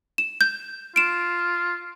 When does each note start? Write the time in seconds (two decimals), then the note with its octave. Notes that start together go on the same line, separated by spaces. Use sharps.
0.18 E7
0.41 G6
0.96 F4 D7 E7